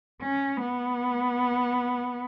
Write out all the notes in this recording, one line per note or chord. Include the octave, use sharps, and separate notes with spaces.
C#4
B3